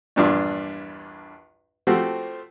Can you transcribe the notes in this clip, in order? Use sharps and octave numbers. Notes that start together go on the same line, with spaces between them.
A#1 E2 G2 D4 F4 D6
F3 A3 C4 F#4 G4